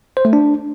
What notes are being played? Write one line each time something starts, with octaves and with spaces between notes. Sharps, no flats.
C5
A3
D4